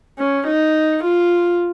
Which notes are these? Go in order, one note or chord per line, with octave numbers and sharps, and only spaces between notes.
C#4
D#4
F4